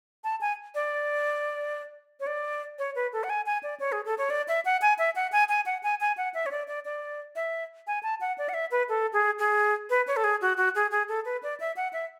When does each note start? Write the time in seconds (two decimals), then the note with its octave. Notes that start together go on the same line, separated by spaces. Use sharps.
0.24 A5
0.41 G#5
0.75 D5
2.20 C#5
2.27 D5
2.79 C#5
2.95 B4
3.13 A4
3.24 F#5
3.30 G#5
3.46 G#5
3.63 D5
3.80 C#5
3.92 G#4
4.06 A4
4.18 C#5
4.30 D5
4.48 E5
4.65 F#5
4.82 G#5
4.98 E5
5.16 F#5
5.32 G#5
5.49 G#5
5.66 F#5
5.83 G#5
6.01 G#5
6.17 F#5
6.34 E5
6.46 C#5
6.51 D5
6.68 D5
6.85 D5
7.36 E5
7.87 G#5
8.03 A5
8.21 F#5
8.38 D5
8.49 F#5
8.54 E5
8.71 B4
8.89 A4
9.13 G#4
9.39 G#4
9.90 B4
10.07 C#5
10.16 A4
10.24 G#4
10.41 F#4
10.57 F#4
10.75 G#4
10.91 G#4
11.09 A4
11.25 B4
11.43 D5
11.60 E5
11.76 F#5
11.93 E5